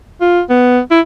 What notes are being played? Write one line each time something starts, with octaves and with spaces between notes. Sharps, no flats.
F4
B3
E4